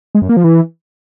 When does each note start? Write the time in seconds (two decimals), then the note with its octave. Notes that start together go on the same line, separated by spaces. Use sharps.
0.15 G#3
0.22 F#2
0.29 A#3
0.37 F3
0.44 E3